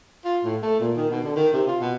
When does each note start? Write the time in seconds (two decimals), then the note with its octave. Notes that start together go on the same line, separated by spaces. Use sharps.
0.25 F4
0.44 A2
0.62 A3
0.80 A#2
0.97 D#3
1.10 B2
1.23 D3
1.36 D#3
1.53 C3
1.68 F4
1.81 B2